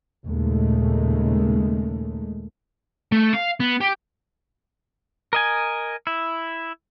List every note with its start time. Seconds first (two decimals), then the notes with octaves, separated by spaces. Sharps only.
0.25 D#2 A#2 C#3 G#3 A3
3.12 A3
3.33 F5
3.60 B3
3.81 G4
5.33 A#4 D#5 G#5
6.07 E4